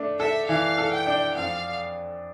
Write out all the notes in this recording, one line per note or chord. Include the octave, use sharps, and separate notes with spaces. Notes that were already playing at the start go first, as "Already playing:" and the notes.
Already playing: A3 D4
A4 E5
E3 F5
A4
G5
D4
F2 F5